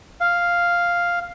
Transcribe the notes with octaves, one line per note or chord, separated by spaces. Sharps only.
F5